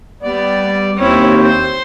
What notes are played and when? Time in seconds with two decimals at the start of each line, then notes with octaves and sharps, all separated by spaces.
0.23 G3 B3 D5
0.97 D#2 C4 C#4 E4
1.43 C5